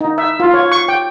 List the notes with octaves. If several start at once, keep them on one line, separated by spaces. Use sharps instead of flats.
D#4
E5
F4
C#5
C#6
G5